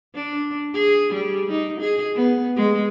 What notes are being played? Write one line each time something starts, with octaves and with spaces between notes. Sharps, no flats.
D4
G#4
G3
D#4
G#4
B3
G#3